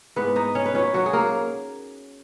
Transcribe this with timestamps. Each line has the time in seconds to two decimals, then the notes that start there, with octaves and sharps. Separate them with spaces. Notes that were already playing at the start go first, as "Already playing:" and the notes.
0.16 G#2 E3 B3 B4
0.36 D#4 D#5
0.55 C#4 C#5
0.66 B4
0.74 A#2 F#3 C#4 C#5
0.94 F#3 F#4
1.06 G#4
1.13 A#3 A#4